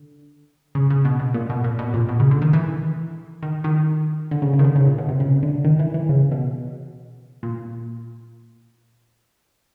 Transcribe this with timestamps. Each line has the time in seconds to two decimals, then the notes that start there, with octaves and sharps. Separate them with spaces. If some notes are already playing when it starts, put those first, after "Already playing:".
Already playing: D3
0.75 C#3
0.90 C#3
1.05 B2
1.20 B2
1.34 A#2
1.50 B2
1.64 A#2
1.79 B2
1.94 A#2
2.09 B2
2.20 C#3
2.31 D3
2.42 D#3
2.53 E3
3.43 D#3
3.64 D#3
4.31 D3
4.42 C#3
4.53 C#3
4.59 D#3
4.64 D3
4.76 C#3
4.87 A#2
4.98 B2
5.09 C3
5.20 C#3
5.43 D3
5.65 D#3
5.79 E3
5.94 E3
6.09 C#3
6.31 B2
7.43 A#2